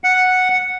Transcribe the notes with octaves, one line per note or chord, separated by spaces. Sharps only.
F#5